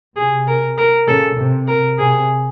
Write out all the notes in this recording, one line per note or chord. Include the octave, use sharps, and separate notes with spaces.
C3 G#4
A#4
A#4
C#3 A4
C3
A#4
C3 G#4